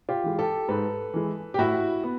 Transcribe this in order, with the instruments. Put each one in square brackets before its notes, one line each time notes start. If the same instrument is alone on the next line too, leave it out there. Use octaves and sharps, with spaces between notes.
[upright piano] F4 G4
E3 G#3
G4 A4
G#2 A4 B4
E3 G#3
G4
A2 E4 F#4
B3